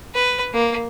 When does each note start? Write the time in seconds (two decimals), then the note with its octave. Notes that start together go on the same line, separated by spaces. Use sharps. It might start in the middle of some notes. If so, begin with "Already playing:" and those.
0.15 B4
0.53 A#3